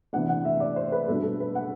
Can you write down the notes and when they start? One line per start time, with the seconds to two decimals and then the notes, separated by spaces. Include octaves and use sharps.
0.13 C3 E3 B3 D4 F#5
0.29 F#5
0.45 E5
0.60 D5
0.76 C5
0.92 B4
1.08 B2 G3 D4 A4
1.23 A4
1.40 B4
1.55 F#5